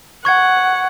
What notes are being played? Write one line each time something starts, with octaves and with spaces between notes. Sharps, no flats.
F#5 C#6 G#6